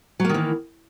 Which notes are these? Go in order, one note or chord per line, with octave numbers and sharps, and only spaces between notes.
D#3 E3 F#3 A#3